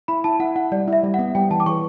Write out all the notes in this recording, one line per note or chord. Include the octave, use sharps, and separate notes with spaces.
E4 B5
E4 A5
E4 F#5
E4 F#5
G3 D5
E4 E5
G3
F#5
B3
G3 G5
E3 A5
D6
E3 C#6